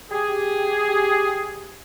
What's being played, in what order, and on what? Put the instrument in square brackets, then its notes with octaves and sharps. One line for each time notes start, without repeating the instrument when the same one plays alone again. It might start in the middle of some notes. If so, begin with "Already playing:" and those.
[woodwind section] G4 G#4